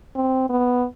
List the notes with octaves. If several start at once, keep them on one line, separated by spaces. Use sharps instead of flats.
C4
B3